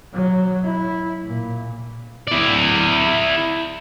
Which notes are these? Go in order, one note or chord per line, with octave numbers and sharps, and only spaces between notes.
F#3
E4
A#2
E4 D5